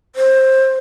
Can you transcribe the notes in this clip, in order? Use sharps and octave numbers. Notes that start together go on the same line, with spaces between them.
C5